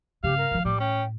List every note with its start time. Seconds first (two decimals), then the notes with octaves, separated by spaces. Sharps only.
0.24 G2 C#3 G4 F5
0.38 A#4
0.51 E3 F3
0.65 A2 G3 D6
0.80 C#4 G5